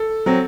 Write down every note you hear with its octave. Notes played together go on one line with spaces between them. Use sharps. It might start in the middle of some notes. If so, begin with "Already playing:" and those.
Already playing: A4
F#3 C4